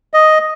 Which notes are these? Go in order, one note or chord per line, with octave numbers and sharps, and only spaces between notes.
D#5